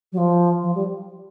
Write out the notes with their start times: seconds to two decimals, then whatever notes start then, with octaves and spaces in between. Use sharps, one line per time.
0.12 F#3
0.17 F3
0.63 F3
0.75 G3